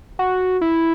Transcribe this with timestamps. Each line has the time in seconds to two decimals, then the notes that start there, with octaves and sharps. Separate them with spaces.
0.19 F#4
0.61 E4